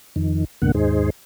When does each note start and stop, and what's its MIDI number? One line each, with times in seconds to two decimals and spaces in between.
0.16 0.45 41
0.16 0.45 51
0.62 0.72 38
0.62 0.72 44
0.62 0.72 47
0.62 0.72 50
0.62 0.72 58
0.62 0.72 78
0.74 1.10 39
0.74 1.10 44
0.74 1.10 63
0.74 1.10 68
0.74 1.10 72